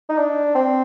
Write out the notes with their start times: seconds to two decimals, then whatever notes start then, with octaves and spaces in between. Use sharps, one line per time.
0.10 D#4
0.18 D4
0.55 C4